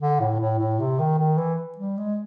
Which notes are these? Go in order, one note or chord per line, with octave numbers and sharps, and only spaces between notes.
D3
A2
A2
A2
C3
D#3
D#3
E3
G3
G#3